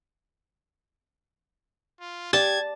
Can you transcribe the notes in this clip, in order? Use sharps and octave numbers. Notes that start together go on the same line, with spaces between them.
F4
G4 D5 A5 G#6